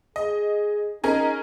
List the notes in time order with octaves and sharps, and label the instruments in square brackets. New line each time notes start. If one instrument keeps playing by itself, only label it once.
[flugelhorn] G#4 [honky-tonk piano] D#5
[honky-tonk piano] C#4 G#4 A#4 [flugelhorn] D#4